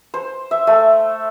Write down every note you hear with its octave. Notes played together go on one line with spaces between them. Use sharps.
C5
E5
A3